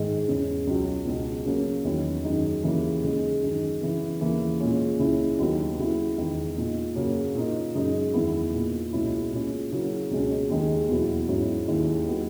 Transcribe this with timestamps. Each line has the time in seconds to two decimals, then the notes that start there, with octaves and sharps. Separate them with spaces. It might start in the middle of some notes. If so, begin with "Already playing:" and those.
Already playing: G#2 D#3 G#3
0.28 E2 C#3 G#3 C#4
0.67 C#2 B2 F#3 C#4
1.06 C#2 B2 G#3
1.45 C#3 F#3 A#3 C#4
1.84 E2 D#3 F#3 C#4
2.24 F#2 D#3 G#3 D#4
2.63 D#2 C#3 E3 A#3
3.03 C#3 G#3 D#4
3.42 F#2 D#3 G#3 D#4
3.81 C#3 E3 B3
4.21 D#2 C#3 E3 A#3
4.60 A#2 G#3 C#4
4.99 C#2 C#3 G#3 C#4 E4
5.39 D#2 D#3 F#3 B3 D#4
5.78 C#3 F#3 B3 E4
6.18 E2 D#3 G#3
6.57 A#2 G#3 D#4
6.96 F#2 C#3 F#3 A#3 C#4
7.35 A#2 A#3 D#4
7.75 F#2 C#3 G#3 D#4
8.14 E2 D#3 G#3 B3 E4
8.53 A#2 A#3 D#4
8.93 C#2 B2 G#3 C#4 E4
9.32 A#2 G#3 C#4
9.71 C#3 F#3 A#3 C#4 E4
10.11 C#2 B2 G#3 C#4
10.50 D#2 D#3 G#3
10.89 E2 B2 F#3 B3 E4
11.28 G#2 F#3 C#4 E4
11.68 D#2 D#3 G#3 C#4 E4
12.08 F#3 B3 D#4